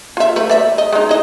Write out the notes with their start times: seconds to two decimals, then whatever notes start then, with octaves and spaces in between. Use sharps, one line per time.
0.17 F4 E5
0.36 A3 B4
0.50 D5 E5
0.78 D#5
0.93 G#3 D#4
1.09 E4 D#5